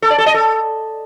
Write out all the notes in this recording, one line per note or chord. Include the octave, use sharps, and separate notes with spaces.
A4
D5
A4
D#5
A4